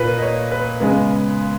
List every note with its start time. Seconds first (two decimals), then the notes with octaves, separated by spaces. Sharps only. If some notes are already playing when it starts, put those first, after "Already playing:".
Already playing: A#2 A#3 B4
0.18 D#5
0.22 C#5
0.52 B4
0.81 C#3 G#3 B3